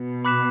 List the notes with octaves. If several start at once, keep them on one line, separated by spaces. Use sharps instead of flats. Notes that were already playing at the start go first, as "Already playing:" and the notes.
Already playing: B2
B5 D6 F#6 B6 E7